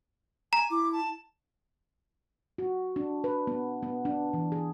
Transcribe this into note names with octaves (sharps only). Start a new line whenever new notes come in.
G#5 A#5
E4 D6
A5
F#4
D4
B4
B3
B3
D4
E3
G#4